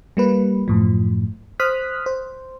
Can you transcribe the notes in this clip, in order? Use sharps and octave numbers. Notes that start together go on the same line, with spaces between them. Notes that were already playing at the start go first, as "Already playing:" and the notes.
G3 A#3 B4
F#2 A2 F3
C5 D#6 F6 F#6 B6
C5